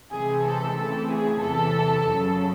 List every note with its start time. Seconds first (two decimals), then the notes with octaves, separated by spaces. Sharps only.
0.12 C3 E3 G#3 C4 G#4
0.44 A4
0.76 C#3 E3 A3 C4 A4
1.09 G#4
1.40 E2 C3 E3 A4
2.05 F#2 C#3 F#3